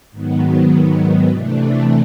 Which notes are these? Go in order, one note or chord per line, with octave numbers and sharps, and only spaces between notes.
G#2 D#3 F#3 B3
C3 E3 A3 D4